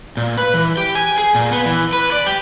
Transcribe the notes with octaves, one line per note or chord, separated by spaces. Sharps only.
A#2
B4
E3
G4
G#5
G#4
A#2
B3
E3
B4
D5
G4